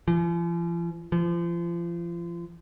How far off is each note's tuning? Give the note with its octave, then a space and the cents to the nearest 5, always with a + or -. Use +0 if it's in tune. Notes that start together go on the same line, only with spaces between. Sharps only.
F3 -45
F3 -35